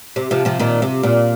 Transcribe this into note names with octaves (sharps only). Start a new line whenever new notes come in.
C3
C3 F3
C3 F3
A#2 D#3
C3
A#2